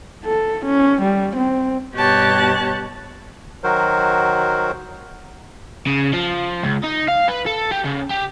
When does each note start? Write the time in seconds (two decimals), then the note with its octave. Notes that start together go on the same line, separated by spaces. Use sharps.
0.25 A4
0.66 C#4
1.02 G3
1.36 C4
1.95 G2 B2 G4 C#5 A5 F#6
3.64 D#3 F#3 F#4 A#4 C5
5.87 C#3
6.13 F3
6.63 C#2
6.83 D#4
7.08 F5
7.28 B4
7.46 A4
7.71 G4
7.84 C#3
8.10 G4